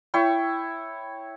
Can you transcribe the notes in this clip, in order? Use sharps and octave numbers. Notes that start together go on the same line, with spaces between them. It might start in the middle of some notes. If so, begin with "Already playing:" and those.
E4 C#5 G5